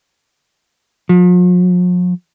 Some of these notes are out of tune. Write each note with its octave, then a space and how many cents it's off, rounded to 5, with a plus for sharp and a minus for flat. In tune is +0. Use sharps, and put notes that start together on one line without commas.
F3 +45